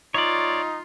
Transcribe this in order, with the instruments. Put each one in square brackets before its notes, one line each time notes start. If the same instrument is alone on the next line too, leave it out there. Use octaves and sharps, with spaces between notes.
[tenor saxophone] D#4 [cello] F4 [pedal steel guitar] C#5 D5